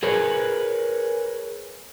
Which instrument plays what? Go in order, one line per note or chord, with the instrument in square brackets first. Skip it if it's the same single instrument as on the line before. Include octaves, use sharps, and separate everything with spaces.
[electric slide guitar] G#4 A#4 B4 C#5